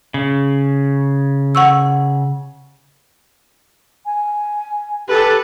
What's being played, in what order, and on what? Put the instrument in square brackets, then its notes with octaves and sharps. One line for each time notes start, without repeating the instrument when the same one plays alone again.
[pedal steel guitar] C#3
[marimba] F#5 C#6 E6
[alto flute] G#5
[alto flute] G4 [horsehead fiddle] A4 B4